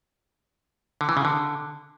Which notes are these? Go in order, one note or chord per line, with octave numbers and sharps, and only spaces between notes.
D3
E3
C#3
D3